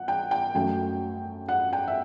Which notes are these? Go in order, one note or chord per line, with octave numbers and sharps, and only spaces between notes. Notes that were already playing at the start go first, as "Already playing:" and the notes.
Already playing: F#5
G5
G5
F#2 F#3 A3 G5
F#5
G5
E5